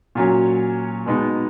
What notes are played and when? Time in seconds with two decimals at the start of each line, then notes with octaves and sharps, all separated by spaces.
0.15 A#2 F#3 C#4
1.06 B2 G#3 B3 D#4